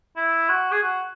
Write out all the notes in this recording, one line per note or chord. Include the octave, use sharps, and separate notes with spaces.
E4
F#4
G#4
F#4